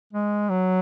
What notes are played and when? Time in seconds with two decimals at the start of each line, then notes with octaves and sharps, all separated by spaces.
0.13 G#3
0.50 F#3